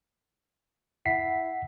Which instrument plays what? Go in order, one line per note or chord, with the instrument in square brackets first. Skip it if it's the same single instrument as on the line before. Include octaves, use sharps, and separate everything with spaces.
[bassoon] E4 [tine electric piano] F#5 B6 C7